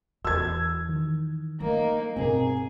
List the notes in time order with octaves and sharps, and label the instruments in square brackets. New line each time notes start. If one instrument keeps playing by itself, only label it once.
[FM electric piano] E2 [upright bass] E3 [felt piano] E6 G#6
[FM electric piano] D#3
[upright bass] F#3 A3 [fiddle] A#3 D#4
[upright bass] G2 B2 [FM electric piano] C4 A#4 [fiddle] G#4